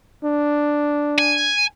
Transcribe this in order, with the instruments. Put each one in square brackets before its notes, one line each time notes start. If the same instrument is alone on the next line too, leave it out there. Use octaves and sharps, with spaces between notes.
[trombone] D4
[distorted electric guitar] G#5